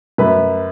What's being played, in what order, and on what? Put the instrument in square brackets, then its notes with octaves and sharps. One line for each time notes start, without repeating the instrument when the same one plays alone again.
[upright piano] F#2 B4